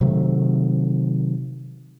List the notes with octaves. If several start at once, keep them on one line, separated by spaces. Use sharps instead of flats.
C3 D#3 F#3 A3